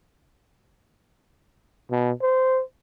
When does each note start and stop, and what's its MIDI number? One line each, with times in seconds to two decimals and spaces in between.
1.91 2.11 47
2.21 2.61 72